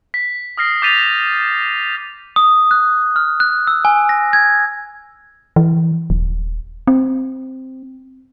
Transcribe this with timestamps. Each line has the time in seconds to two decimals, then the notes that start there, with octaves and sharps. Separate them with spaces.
0.14 B6
0.57 D#6 F6 A#6 C7
0.82 D6 G6 A6 B6 D#7 F7
2.36 D#6
2.71 F#6
3.16 F6
3.40 F#6
3.67 E6
3.85 G#5
4.09 A#6
4.33 G#6
5.56 E3
6.10 D#1
6.87 C4